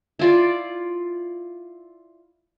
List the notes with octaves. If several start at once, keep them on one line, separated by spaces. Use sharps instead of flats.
E4 F4 D5